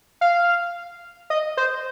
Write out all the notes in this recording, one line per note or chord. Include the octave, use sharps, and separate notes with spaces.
F5
D#5
C5